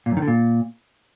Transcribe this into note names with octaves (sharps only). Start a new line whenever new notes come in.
A#2
F#2
D#3
D3
A#2